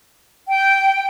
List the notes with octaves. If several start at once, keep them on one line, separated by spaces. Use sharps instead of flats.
G5